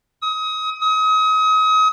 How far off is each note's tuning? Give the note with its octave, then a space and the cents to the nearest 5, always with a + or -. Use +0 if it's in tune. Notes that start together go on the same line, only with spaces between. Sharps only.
D#6 +30
D#6 +35